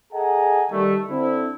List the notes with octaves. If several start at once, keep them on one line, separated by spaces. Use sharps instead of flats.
G#4 A4 D#5 F#5 G#5 A#5
D#3 G3 A3
D3 C4 E4